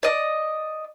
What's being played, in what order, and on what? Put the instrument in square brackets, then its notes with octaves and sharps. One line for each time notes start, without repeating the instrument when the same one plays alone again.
[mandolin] D5 D#5